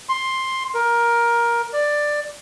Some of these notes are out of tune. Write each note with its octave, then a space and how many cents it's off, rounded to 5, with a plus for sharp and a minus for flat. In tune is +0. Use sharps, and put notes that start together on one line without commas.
C6 +10
A#4 +15
D5 +10